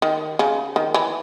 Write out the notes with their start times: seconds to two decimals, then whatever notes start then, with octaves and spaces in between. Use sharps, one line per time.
0.02 D#3
0.39 C#3
0.76 D#3
0.94 E3